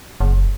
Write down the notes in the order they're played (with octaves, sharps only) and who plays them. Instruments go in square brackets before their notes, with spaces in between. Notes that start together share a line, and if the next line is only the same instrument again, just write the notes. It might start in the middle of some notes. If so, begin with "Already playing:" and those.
[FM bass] F#1